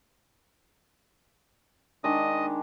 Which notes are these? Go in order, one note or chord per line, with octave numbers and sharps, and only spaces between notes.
D#3 G#3 D4 D#5 D#6